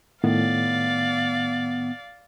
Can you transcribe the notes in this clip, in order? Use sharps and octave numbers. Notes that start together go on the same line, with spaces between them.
A2 D#3 B3 D5 F5